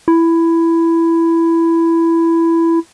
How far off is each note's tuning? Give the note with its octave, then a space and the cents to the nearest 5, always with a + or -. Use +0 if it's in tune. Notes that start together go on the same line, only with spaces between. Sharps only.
E4 +10